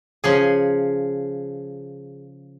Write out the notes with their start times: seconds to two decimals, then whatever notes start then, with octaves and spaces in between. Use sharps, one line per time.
0.24 C#3 F3 G#4